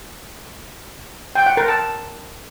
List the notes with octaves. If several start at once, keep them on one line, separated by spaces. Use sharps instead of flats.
G5
F#5
A#4
A5